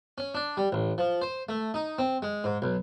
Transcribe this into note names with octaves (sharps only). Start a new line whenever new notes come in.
C#4
D4
G3
A1
F3
C5
A3
D#4
C4
G#3
G#2
B1